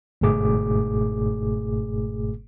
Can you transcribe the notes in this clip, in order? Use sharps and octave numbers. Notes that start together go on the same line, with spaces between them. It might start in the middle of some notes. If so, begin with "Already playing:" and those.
G1 G#2 B2 A3 G#4 D6